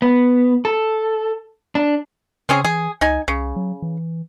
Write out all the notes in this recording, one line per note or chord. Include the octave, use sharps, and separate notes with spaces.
B3
A4
D4
C#3 C4 C#4 G#4
E3 G#4
C#2 D#4 G#5
C2 C#3
F#3
E3